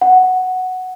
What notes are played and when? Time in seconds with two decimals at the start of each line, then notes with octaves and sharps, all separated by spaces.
0.01 F#5